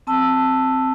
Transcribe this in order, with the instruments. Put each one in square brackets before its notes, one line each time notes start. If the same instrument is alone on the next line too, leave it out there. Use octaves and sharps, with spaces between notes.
[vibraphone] C4 A5 E6